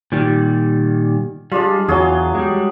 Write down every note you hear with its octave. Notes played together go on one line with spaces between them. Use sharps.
A#2 D#3 G3
G3 G#3 D4 F4
E2 F#3 F4 F#4 G#4
G3 G#3